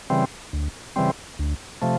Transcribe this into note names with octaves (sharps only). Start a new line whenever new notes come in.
C#3 E3 G3 C4
D2
C#3 E3 G3 C4
D2
C3 F3 A3